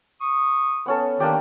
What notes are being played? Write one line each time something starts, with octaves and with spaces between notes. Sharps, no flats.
C#6 D#6
B3 C#4 A4
D#3 A#3 D4 G4